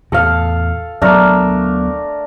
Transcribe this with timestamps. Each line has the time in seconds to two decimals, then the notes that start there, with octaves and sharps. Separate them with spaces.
0.12 E2 A2 A4 F5
1.02 D2 F#3 A3 B3 D4 A#4